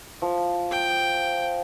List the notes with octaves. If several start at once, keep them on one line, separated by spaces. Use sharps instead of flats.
F3
G5